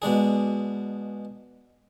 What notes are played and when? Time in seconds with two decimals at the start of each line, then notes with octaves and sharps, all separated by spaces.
0.02 B2 G#3 D4 G#4